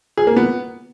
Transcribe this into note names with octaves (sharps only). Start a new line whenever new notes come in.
G#4
A#3
B3